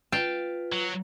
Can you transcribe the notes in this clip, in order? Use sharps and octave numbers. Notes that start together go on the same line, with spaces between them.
F4 B4 F5 G5 A5
F#3